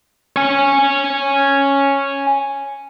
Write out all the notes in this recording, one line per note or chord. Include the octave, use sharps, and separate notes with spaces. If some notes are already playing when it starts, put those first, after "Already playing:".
C#5 G#5